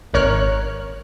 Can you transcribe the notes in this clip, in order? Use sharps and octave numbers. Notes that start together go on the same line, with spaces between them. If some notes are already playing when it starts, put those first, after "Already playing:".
G#1 A#4 C#5 F6 F#6